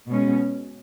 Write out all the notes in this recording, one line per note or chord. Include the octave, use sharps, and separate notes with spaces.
B2 G#3 C#4